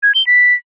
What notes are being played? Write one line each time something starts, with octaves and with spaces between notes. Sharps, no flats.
G#6
G7
B6